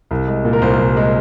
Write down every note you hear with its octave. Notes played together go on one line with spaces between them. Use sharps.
C2
G#3
A#2
A#4
C2 C5
C2
G#3